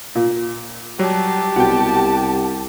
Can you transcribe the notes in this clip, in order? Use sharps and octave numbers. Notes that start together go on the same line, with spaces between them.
A#2
F#3 G3 G4 A5
C2 B2 F#5 G5